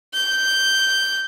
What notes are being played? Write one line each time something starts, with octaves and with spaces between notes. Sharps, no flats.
G6